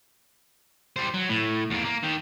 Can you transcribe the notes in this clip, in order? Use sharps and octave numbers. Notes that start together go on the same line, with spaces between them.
G3 C5
F#3
A2
E2 A#3
A#3
D#3 G4